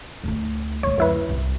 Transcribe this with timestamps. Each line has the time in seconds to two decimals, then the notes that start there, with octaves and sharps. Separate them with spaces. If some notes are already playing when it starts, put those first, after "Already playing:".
0.24 D2 D#4
0.83 D2 D#3 C#5
0.98 F#2 E4 B4
1.29 C2